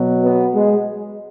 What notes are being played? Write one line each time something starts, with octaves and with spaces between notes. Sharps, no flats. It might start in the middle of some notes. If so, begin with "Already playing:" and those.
Already playing: B2 F#3
B3
G#3